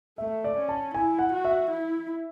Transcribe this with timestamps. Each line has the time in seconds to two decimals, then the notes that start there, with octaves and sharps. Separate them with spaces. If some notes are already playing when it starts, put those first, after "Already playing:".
0.18 A3 E5
0.44 D5
0.57 C#4
0.69 A5
0.94 E4 G#5
1.19 F#5
1.32 F#4
1.45 E5
1.70 E4